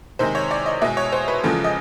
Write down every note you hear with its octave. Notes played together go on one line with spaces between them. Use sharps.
C3 D#3 G#3 C5
C#5
D5
D#5
B2 G#3 E5
C#5
C5
B4
E2 C#3 F3 G#3 A4
D#5